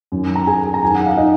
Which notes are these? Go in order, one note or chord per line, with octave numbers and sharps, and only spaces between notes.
F#2 D#3
A#5
G#4 G#5
A#5
F#2 D#3 G#5
F#5
F5
D#4 D#5